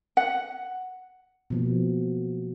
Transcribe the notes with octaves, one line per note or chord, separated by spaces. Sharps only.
F#5
B2 F3 A#3